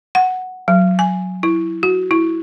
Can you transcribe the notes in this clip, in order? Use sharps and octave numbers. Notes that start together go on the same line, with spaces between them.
F#5
F#3
G#5
E4
F#4
E4